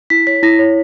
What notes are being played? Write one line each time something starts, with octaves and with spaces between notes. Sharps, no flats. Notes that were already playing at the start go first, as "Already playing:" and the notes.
E4 B6
C#5 B6
E4 A#6
C#5